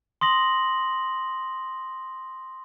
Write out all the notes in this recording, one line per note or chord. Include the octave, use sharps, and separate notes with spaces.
C6 D#6 A#6 F#7